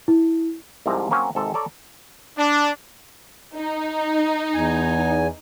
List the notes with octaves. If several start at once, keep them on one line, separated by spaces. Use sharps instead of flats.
E4
C2 G#2 C3 F3 C4 A#5
F#3 A#3 C4 C#4
G#1 G#2 C3 A4
A4 C#5 D5 A#5
D4
D#4
E2 G#5